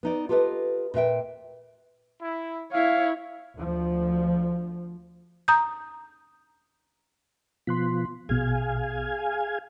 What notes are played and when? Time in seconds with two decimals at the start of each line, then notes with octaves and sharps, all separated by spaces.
0.03 B3 D#4 D5
0.29 F4 G4 A4 B4 D#5
0.94 A#2 B4 E5 G5
2.22 E4
2.73 E4 C#5 F5
3.55 D2 F3
5.48 A#5 D#6 G6
7.67 B2 F3 C6 F#6 B6
8.29 A#1 B2 G#4 F5 G#5